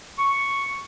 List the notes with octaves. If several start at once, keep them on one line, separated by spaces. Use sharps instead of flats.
C#6